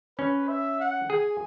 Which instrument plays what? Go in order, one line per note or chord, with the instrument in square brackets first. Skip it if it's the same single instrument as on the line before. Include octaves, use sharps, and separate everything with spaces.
[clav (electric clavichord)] C#4 [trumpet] B4
[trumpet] E5
F#5
[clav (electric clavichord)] G#4 [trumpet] G#5